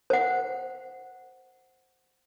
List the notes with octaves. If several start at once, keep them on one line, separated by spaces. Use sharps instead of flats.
C5 F#5